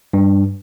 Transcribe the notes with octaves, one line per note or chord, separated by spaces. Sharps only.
G2